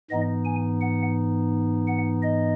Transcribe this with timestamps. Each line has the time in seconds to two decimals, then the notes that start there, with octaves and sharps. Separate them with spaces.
0.10 G#2 E3 B3 D#4 D#5
0.45 G#5
0.81 F#5
1.87 F#5
2.22 D#5